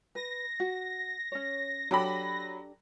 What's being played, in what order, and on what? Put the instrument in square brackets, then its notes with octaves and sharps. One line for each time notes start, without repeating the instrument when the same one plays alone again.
[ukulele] B4 [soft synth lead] A#6
[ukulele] F#4
C#4 C#5
[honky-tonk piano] F#3 B5 [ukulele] D4 G4 A4